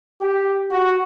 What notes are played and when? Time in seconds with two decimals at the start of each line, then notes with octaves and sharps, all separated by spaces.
0.20 G4
0.70 F#4